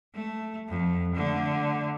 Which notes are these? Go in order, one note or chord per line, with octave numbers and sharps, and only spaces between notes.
A3
F2
D3 A3